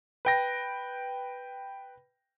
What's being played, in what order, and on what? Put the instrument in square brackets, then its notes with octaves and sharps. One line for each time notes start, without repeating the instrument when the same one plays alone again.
[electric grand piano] B4 G5 A#6